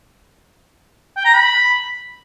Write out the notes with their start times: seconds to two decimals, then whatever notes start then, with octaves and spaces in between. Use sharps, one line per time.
1.17 G5
1.25 A#5
1.34 B5